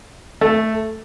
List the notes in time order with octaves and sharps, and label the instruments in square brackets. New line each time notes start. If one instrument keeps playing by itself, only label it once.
[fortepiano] A3